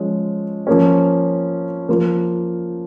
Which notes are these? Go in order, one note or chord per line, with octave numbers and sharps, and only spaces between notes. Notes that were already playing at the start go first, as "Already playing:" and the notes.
Already playing: F3 G#3 C#4
F3 A#3 C#4
F3 A#3 F4